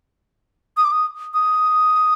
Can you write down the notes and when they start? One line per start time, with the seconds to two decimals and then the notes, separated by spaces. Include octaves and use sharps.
0.77 D#6
0.84 D6
0.92 D#6
1.34 D#6